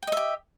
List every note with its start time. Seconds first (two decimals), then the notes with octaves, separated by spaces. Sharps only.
0.03 G5
0.07 D#5
0.12 E5
0.17 G4